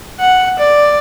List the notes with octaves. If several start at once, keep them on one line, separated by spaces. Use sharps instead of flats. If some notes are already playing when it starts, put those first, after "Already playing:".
F#5
D5